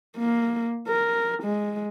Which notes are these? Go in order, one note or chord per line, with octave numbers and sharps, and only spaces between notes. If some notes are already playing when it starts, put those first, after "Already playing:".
A#3
A#4
G#3